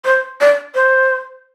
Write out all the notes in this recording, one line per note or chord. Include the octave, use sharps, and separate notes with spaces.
C5
D5
C5